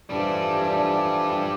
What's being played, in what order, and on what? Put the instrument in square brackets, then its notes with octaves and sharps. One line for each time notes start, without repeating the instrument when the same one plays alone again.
[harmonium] E3 F3 A4 [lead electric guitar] G3 D4